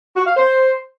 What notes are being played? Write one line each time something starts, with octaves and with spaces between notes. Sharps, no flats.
F#4
F5
C5